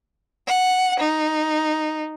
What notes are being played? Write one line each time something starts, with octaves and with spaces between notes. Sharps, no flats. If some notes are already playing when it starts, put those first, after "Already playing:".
F#5
D#4